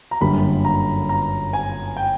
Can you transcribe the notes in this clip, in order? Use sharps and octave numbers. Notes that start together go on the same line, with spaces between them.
A#5
G1 F#2 D3 G3 A#3 B5
A#5
A#5
G#5
G5